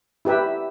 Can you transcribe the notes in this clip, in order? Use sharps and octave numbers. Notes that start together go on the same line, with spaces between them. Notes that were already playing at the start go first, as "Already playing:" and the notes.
E4 G4 B4 E5